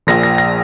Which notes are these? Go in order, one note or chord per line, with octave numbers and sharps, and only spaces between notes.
A#1 A#2 F3 A#6
A#6
A#6